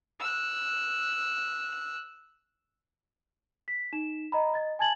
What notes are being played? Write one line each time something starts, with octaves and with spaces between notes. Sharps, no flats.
E6 F#6
B6
D#4 E7
D#5 A#5 B5
D#5 A6
G#5 A5 G#6 A6 F#7